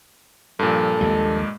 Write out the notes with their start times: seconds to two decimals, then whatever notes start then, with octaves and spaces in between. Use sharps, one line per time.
0.59 G2 A#2 F3 A4
1.01 A#1 D#2 G3 G#3